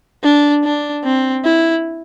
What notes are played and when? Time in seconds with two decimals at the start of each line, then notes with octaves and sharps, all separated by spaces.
0.23 D4
0.64 D4
1.04 C4
1.44 E4